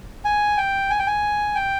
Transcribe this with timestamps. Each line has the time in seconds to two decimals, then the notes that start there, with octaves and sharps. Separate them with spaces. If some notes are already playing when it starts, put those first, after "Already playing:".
0.25 G#5
0.57 G5
0.90 G#5
0.99 G5
1.07 G#5
1.55 G5